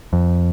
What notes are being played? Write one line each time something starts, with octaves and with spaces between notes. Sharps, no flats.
F2